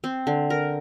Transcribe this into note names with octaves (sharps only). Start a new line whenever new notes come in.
C4
D3
A#4